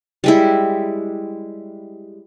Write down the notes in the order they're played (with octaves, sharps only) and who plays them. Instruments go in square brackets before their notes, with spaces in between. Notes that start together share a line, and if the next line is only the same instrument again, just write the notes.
[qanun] G3 G#3 E4